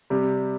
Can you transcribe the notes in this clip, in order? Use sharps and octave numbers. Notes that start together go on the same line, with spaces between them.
C3 G3